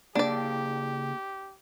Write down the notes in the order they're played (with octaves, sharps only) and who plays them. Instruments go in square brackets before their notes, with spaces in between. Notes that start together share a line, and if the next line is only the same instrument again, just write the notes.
[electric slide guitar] C#3 A#3 G#4 [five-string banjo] D4 D5 [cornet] G4